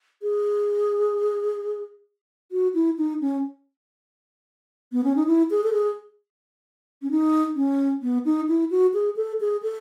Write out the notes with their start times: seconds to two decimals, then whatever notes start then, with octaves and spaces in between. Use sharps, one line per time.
0.22 G#4
2.52 F#4
2.74 E4
2.98 D#4
3.21 C#4
4.92 B3
5.04 C#4
5.16 D#4
5.27 E4
5.51 G#4
5.64 A4
5.73 G#4
7.02 C#4
7.11 D#4
7.56 C#4
8.02 B3
8.25 D#4
8.49 E4
8.71 F#4
8.94 G#4
9.16 A4
9.41 G#4
9.63 A4